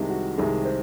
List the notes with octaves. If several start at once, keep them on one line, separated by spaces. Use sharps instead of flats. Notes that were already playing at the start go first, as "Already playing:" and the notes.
Already playing: C2 C3 D#3 G#3
F#4
C2 C3 D#3 G#3 G#4
C5